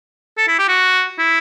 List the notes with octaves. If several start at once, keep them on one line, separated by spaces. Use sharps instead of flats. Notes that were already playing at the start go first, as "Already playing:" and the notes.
A4
E4
G4
F#4
E4